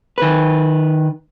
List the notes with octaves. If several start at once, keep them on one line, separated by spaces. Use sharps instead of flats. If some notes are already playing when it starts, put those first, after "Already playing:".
D#3 B4